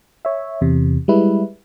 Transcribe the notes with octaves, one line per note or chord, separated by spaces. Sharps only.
C#5 E5
E2 C3
G3 G#3 E4 B4